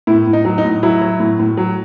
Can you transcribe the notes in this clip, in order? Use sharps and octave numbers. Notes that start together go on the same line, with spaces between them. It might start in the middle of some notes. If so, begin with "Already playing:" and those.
A2 E4
A2
D#4
F#3
D#4
A2
F#3 E4
F#3
A2
A2
F#3